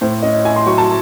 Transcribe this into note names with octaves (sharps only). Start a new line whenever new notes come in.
A2 C5
C#4 D#5
E4 G#5
C6
F#3 C#6
A5